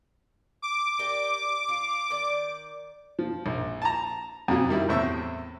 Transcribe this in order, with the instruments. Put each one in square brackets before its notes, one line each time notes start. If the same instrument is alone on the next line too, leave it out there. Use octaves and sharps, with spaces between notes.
[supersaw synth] D6
[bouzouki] G4 A#4 D5
F4
D#3 D5
[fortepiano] F3
A#1
A5 A#5
F2 C3 F#3
D#3 G3 E4
E2 A2 C4 E5 C#6 E6